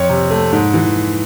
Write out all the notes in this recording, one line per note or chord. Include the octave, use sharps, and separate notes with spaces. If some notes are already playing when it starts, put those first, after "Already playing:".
Already playing: F2 C#5
C3
A3
G#2
E3